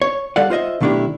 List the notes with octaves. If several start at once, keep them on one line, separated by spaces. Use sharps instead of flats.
C#5
G3 A4 D5 F5 F#5
F4 C5 D#5 E5
B1 D#3 A3 D4 E4 G4